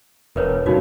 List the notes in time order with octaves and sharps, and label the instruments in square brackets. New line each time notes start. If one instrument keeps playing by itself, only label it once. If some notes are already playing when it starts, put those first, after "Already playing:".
[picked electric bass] E1 [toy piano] A#4 B4 C#5
[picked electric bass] G2 A#2 C#3 [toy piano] D#4 F#4 C#5